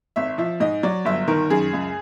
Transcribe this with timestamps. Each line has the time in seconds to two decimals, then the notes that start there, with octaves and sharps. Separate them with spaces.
0.16 G#1 E5
0.38 F3 E5
0.60 G#2 D#5
0.83 F#3 D5
1.05 G1 E5
1.28 D#3 A#4
1.50 F#2 G#4
1.73 C#2